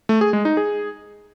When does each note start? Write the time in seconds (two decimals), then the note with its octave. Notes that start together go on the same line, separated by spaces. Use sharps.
0.09 A3
0.21 G#4
0.33 G#3
0.45 D#4
0.57 G#4